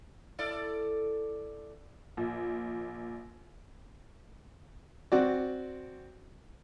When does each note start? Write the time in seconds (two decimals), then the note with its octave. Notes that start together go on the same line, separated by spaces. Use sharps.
0.39 E4 A4 D5
2.17 A#1
5.12 C4 F#4 D5